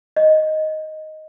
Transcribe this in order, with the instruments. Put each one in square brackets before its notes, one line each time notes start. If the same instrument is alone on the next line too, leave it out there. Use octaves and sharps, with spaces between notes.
[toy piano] D#5